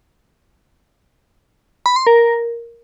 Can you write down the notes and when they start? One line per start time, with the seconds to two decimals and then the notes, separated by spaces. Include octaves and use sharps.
1.86 B5
1.96 C6
2.07 A#4